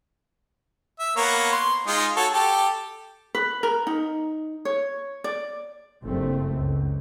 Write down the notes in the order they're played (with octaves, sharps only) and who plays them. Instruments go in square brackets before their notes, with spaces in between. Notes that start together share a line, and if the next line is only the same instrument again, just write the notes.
[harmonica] E5
A#3 B3 C#5
C6
G#3 D#4 F4
F#4 A4 C#5
G4 A4
[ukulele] B4
A#4
D#4
C#5
D5
[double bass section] F#1 G2 A3 C4
C#2